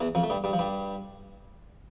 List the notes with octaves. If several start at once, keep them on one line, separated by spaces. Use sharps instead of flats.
E2 E3
F2 F3
A3
G2 G3
G2 G3
F3
G2 G3